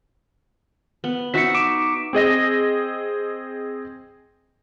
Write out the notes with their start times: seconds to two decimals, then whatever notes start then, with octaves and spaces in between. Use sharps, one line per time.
1.04 B3
1.34 D#4 F#4 E5 B6 C#7
1.55 D6 D7 E7
2.13 C4 G#4 D#5 A#6